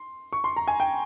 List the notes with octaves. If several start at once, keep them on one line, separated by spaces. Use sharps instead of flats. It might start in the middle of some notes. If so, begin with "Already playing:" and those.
Already playing: C6
C#6
C6
A#5
G#5
G5